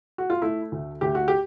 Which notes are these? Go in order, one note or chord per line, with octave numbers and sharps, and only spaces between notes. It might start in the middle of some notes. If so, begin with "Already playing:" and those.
F#4
F4
A3 E4
D2
D2 G4
F#4
G4